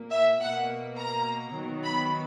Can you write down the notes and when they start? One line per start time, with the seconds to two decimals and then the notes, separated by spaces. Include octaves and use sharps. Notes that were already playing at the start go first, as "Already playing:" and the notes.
Already playing: A#2 A#3
0.11 E5
0.40 B2 A#3 F#5
0.98 A#5
1.55 D#3 F#3 B3
1.84 B5